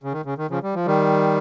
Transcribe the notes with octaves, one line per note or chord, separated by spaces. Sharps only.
C#3
D#3
C#3
D#3
C#3 F3
G3
F3
D#3 G3